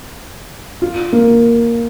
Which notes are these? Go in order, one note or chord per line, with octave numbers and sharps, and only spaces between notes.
F4
A#3